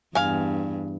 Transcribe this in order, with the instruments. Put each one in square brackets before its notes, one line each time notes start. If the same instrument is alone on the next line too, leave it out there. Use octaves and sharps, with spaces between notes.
[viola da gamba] E2 G2 [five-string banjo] F5 G#5